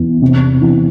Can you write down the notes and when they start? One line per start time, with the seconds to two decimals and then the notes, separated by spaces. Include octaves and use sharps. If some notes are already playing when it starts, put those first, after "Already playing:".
Already playing: E2
0.21 C3
0.61 E3